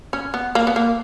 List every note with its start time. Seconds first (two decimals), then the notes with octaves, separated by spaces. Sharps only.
0.13 C#4
0.34 B3
0.55 A#3
0.67 B3
0.76 A#3